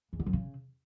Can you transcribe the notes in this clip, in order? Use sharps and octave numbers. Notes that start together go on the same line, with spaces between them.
E2
D3
F#2
C#3